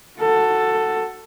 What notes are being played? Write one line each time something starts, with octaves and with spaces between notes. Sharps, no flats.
F#4 A4